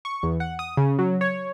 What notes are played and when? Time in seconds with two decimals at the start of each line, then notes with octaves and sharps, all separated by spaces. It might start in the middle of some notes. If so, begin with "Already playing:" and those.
0.05 C#6
0.23 E2
0.40 F#5
0.59 D#6
0.77 C#3
0.99 F#3
1.21 C#5